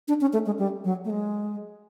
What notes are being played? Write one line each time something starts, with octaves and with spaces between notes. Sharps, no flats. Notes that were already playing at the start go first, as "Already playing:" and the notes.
D4
C#4
A3
G#3
G3
F#3
A3
G#3